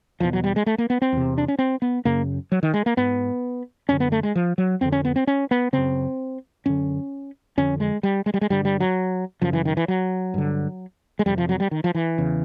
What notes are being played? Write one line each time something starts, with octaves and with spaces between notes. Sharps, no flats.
E2 B2 F3
F#3
G3
G#3
A3
A#3
B3
C4
E2 C3
D4
C#4
C4
B3
F#2 C#3 A#3
F#3
D#3
G#3
A#3
G#2 B3
F#2 D3 C#4
B3
A3
G#3
F3
F#3
F2 D3 C4
C#4
B3
C4
C#4
B3
F#2 C#3 C4
F#2 D3 C#4
F2 D3 C#4
G#3
G3
G#3
G3
G#3
G2 D3 G3
G3
F#3
F#2 C#3 F3
E3
D#3
E3
F#3
G2 D3
G#3
F2 C3 G3
F3
F#3
G3
D#3
F3
E3
E2 C#3